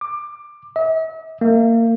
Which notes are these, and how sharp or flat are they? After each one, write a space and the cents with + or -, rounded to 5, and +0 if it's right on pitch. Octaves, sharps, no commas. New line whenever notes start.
D6 +20
E5 -45
A#3 -25